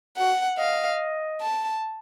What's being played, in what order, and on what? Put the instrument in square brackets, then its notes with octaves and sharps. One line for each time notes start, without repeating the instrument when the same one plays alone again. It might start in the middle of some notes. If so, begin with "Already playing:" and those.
[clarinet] F#4 [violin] F#5
[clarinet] D#5 [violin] F5
[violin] A5